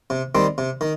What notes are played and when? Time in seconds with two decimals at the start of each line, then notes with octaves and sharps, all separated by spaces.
0.10 C3
0.35 D#3 G3 C4
0.58 C3
0.81 D#3